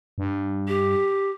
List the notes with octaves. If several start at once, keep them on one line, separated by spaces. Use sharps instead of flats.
G2
G4